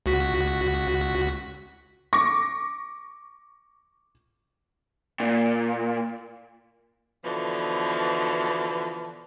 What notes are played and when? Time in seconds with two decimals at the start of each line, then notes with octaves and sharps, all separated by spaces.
0.06 C#2 F#4 B6
2.13 C#6 D6 A#6
5.20 A#2
7.24 B2 D3 E3 F3